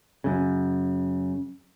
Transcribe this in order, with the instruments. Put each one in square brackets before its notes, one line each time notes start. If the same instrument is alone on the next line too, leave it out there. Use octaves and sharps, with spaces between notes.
[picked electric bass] F#2 C#3